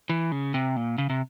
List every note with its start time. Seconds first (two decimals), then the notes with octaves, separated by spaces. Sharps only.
0.10 E3
0.32 C#3
0.54 C3
0.76 A#2
0.98 C#3
1.10 C3